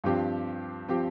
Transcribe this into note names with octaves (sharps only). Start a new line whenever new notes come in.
G2 F3 C4 G4
F3 C4 G4